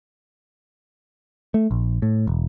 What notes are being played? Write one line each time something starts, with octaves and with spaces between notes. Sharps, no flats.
A3
A#1
A2
E1